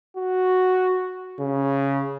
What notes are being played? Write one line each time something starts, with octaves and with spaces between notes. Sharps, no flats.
F#4
C#3